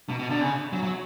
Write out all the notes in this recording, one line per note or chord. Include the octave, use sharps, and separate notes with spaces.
B2
B2
D3
C#3
F#3
F#3